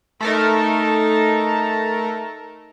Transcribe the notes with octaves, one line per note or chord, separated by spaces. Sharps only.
A3 D#4 A4 A#4 A5